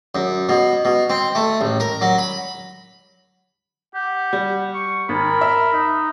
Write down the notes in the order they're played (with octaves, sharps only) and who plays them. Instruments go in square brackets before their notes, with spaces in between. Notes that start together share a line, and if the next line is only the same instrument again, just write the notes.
[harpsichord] F#2
B2
B2
C4
A3
A1
A#4
F#3
B5
[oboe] G4 [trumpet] F#5
[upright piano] G3
[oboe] C#6
[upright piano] G#1 [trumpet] A#4 [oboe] B5
[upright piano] E5
[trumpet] D#4